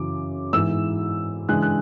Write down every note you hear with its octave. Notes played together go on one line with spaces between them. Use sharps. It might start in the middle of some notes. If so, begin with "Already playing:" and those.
Already playing: F#2 C#3 E3 D6
G#2 E3 B3 E4 E6
C#3 E3 G#3 D4 F#6
F#6